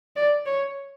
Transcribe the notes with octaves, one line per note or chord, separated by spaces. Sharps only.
D5
C#5